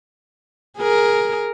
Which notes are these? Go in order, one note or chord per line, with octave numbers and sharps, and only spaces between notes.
G#4 A#4